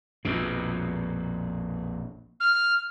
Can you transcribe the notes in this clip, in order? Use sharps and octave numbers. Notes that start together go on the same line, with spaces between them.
A#1 F2 B2
F6